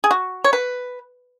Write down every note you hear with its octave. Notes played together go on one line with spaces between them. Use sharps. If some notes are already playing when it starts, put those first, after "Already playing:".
G#4
F#4
C#5
B4